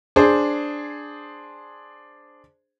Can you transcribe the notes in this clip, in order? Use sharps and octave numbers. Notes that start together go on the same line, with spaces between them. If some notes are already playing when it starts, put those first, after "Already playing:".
D4 G#4 C5